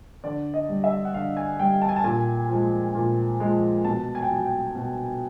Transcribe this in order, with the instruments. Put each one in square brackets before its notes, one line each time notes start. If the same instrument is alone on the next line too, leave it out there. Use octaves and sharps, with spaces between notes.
[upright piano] D3 D5
D#5
G3
E5
F#5
D3 F5
G#5
G3 G5
A5
G#5
A5
A#2 G#5
F3 G#3
A#2
F3 G#3
B2 A5
G#5
G5
F#3 G#5
G5
B2